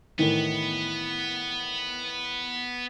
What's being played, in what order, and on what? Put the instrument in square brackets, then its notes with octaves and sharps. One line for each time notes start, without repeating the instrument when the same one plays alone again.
[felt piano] A2 D#3 E3 [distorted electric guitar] B3